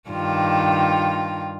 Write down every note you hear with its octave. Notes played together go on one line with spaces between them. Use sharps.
G2 D#3 F4